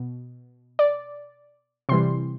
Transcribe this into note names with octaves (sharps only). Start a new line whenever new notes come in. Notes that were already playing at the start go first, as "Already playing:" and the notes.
Already playing: B2
D5
C3 E3 G3 C6